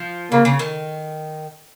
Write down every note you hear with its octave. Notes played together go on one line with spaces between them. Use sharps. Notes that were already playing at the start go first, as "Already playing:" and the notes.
Already playing: F3
C#3 A#3
C#3
D#3